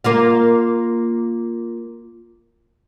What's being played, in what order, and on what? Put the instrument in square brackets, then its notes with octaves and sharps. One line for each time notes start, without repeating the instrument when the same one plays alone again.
[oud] A#3 F4 F5